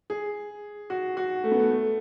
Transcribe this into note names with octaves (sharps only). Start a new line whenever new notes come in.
G#4
F#4
F#4
A3
B3
A3
A3